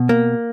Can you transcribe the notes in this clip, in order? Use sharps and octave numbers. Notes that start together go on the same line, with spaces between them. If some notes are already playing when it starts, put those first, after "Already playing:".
Already playing: B2
A#3